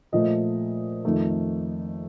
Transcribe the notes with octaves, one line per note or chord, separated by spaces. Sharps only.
A#2 F3 A3 D#5
F2 D#3 A3